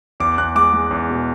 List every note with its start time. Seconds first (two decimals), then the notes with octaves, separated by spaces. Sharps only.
0.20 E2 D6
0.38 E2 F#6
0.55 G#3 D6
0.73 G#3
0.91 E2
1.10 B2